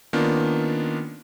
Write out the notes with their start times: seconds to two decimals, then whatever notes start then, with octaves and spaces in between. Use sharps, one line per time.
0.13 D#3 A#3 B3 C#4 D4 F4